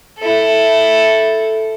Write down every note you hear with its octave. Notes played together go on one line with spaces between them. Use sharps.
E4 A4